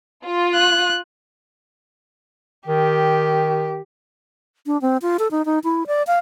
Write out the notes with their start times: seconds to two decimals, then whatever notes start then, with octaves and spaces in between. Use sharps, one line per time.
0.24 F4
0.55 F#6
2.68 D#3 G4
4.67 D4
4.82 C4
5.02 F4
5.19 A4
5.31 D#4
5.45 D#4
5.64 E4
5.87 D5
6.07 F5